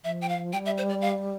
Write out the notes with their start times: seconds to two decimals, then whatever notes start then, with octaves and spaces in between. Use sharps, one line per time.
0.04 F3 E5
0.22 G5
0.29 F5
0.53 G3 G5
0.66 E5
0.78 C5
0.89 D5
1.01 F5